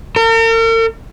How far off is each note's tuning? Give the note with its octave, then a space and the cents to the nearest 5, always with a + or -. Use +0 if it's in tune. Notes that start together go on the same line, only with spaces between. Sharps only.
A#4 -45